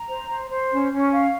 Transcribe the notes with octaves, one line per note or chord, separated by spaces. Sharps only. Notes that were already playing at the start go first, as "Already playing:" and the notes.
Already playing: A#5
C5
C5
C5
C#4
C#4
F5